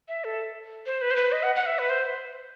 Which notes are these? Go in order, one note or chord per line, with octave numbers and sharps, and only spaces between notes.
E5
A4
C5
B4
C5
B4
D#5
F#5
F#5
E5
B4
C5